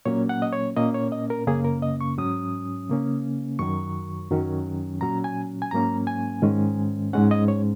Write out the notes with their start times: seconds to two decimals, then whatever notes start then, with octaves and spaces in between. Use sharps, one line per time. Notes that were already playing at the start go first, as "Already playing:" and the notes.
0.06 A#2 F#3 A#3 C#4 C#5
0.29 F#5
0.42 D#5
0.53 C#5
0.77 A#2 A#3 C#4 D#5
0.94 C#5
1.12 D#5
1.30 A#4
1.47 F#2 C#3 A#3 C#4 G#4
1.65 A#4
1.82 D#5
2.01 C#6
2.18 G#2 F#3 C#4 D#6
2.89 C#3 A#3 C#4
3.59 F#2 D#3 F#3 C#6
4.31 F#2 D#3 F#3 C#4
5.01 A#2 F#3 C#4 A#5
5.24 G#5
5.62 G#5
5.71 G#2 F#3 A#3 C#4 A#5
6.07 G#5
6.42 G#2 D#3 G#3 C#4
7.13 G#2 G#3 C#4 F#5
7.31 D#5
7.48 C#5